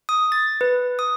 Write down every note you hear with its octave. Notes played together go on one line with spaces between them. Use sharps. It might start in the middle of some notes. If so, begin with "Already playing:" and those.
D#6
A6
B4
D#6